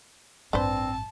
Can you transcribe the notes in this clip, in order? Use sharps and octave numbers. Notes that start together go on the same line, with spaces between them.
A1 G2 C4 D4 B4 C5 A5